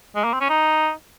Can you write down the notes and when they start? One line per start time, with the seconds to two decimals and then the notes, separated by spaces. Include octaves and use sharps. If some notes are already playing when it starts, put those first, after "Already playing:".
0.15 G#3
0.24 A#3
0.33 C4
0.41 C#4
0.49 D#4